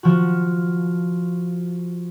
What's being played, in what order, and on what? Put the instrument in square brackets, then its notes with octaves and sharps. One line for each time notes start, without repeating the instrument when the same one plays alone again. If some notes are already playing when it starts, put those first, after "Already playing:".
[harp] F3 F#4